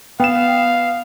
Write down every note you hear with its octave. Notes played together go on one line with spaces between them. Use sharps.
B3 F5 G5 E7